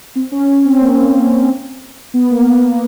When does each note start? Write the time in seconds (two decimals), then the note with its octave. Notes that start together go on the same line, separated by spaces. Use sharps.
0.15 C4
0.32 C#4
0.65 C4
0.81 A#3
2.14 B3
2.31 A#3
2.48 B3
2.63 A#3